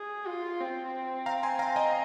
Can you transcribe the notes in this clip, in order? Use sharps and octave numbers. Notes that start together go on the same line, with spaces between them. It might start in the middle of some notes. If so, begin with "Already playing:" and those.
Already playing: G#4
F4
C4
F5 A#5
G#5 C6
F5 A#5
D#5 G#5